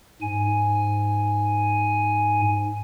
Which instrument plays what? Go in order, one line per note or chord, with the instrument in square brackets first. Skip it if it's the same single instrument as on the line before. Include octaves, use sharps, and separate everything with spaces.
[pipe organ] G#2 G#5